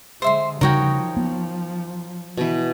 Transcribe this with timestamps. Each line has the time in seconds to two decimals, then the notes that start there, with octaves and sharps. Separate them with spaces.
0.22 D3 G#3 C5 E5 C6
0.61 C#3 F3 G3 D#4 F#4 A#4 C#5 G5
1.17 B3
2.37 B2 E3